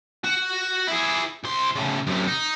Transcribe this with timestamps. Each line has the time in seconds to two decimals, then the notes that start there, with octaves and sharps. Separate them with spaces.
0.24 F#4
0.88 E4 G#4
1.44 C2 C6
1.75 A2 C#3
2.07 F#2 C3
2.28 D#4